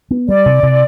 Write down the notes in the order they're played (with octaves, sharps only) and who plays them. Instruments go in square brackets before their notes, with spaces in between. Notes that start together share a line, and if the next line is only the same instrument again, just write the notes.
[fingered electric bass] B3
[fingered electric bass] G3 [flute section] D5
[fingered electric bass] C3
C3